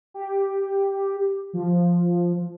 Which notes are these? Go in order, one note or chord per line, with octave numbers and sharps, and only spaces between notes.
G4
F3